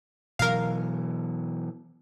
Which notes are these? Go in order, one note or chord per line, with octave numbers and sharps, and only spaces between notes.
B2 E3 F#3 A#4 F5